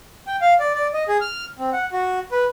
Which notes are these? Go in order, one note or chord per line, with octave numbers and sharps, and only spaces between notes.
G5
F5
D5
D5
D#5
G#4
F6
C4
F#5
F#4
B4